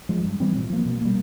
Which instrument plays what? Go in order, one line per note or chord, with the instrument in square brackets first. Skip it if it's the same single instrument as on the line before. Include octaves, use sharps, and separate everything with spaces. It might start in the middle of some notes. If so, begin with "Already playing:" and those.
[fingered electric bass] F3 G#3
G2
E3 G3 C4
A#2
F3 A#3
B2
G3 A#3